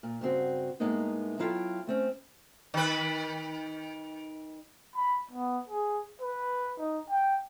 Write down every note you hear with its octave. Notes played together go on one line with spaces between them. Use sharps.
A#2
G2 C#3 C4 F#4
A2 G#3 A#3 B3 D#4
F#3 E4 F4 A4 E5 G5
A3 C4 C#4
D#3 B4
B5
B3
G#4
B4
D#4
G5